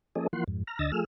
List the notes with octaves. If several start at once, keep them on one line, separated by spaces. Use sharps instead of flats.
F3 A#3 C#4 G#4 A4 D#5
E3 F3 A#3 F#5 C6
F2 G#2
A#5 F6
D2 D3 D#5 E6 A6 A#6
F3 A3 G#4 E6 F6